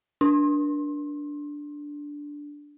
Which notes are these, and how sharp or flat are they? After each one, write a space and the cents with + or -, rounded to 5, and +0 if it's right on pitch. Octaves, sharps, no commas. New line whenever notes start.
D4 -5